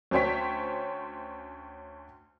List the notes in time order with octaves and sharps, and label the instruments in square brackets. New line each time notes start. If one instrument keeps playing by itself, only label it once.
[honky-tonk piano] D2 C#4 C5 C#5 G5 B6